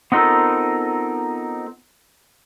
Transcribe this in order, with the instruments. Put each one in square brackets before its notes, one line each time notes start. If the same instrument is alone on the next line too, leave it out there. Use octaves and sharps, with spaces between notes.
[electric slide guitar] B3 C4 D#4 F4 A4 A#4